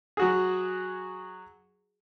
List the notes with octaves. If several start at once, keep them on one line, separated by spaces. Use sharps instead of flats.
F#3 F#4 G#4